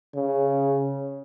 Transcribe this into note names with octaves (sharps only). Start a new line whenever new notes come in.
C#3